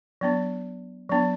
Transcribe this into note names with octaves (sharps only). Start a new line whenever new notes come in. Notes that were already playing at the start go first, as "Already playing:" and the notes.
F#3 B3 D4
F#3 B3 D4